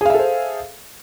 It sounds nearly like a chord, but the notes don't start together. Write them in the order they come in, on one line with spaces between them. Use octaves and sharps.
G#4 F5 E5 A4 C5